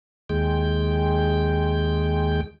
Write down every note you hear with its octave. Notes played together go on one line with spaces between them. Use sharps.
D#2 G#3 G5